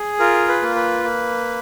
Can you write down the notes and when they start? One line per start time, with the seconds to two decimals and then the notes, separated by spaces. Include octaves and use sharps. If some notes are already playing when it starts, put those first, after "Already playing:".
Already playing: G#4
0.19 F4 A#4
0.48 B4
0.62 A#3
0.75 B4
1.04 A#3